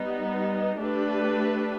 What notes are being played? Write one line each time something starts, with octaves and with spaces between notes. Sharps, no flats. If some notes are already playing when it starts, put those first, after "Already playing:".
Already playing: G3 B3 D#4
A3 D4 G4 B4